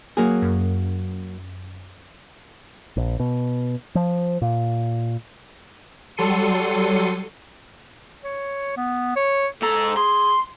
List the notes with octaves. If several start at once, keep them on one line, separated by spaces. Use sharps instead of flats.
F#3 A#3 G#4
F#2
A#1
B2
F3
A#2
F#3 G3 A4 C6 C#7 D#7
C#5
B3
C#5
G#2 A4 A#5
G#4 C6